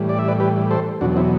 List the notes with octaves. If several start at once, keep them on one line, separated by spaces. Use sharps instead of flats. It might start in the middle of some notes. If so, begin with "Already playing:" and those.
Already playing: A2 E3 G3
D5
E5
B4 D5
G4 B4
A4 C5
E2 B2 F#3 D4 F#4
C4 E4